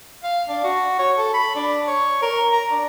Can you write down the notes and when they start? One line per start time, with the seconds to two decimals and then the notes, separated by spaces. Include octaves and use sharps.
0.23 F5
0.48 D4
0.64 F#4
0.99 C#5
1.17 A4
1.34 B5
1.55 D4
1.87 C#5
2.22 A#4
2.52 A#5
2.71 D4